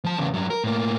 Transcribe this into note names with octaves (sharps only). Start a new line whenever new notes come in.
F3 A5
E2 C#3
G2 F#3
A#4
A2 A#3